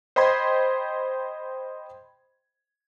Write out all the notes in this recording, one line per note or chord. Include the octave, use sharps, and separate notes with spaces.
C5 D#5 G5 B5 C6 G#6